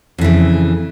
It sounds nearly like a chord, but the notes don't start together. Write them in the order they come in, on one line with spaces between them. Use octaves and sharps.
F2 E3 C#3